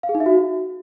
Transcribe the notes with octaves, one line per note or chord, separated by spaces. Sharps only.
F5
G#4
D#4
E5
F#4